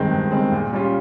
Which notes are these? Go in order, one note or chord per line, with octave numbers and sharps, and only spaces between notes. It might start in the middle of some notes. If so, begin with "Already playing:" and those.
Already playing: G2 D#3 G#3 C4
G2
D#3 G#3 C4
A#2
G3 C#4 F4